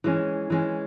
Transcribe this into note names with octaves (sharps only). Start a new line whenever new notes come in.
E3 G#3 C#4
E3 G#3 C#4